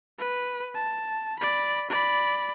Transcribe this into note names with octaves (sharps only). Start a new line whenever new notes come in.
B4
A5
D5 B5
D5 B5